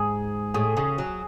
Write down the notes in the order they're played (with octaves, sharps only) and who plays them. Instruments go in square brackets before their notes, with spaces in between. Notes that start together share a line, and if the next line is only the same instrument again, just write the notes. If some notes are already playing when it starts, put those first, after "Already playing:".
Already playing: [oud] G#2 [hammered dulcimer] G#4
[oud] A2 [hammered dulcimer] G#4
[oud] C#3 [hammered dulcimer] G#4
[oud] F#3